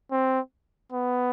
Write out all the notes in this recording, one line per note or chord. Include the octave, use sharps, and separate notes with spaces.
C4
B3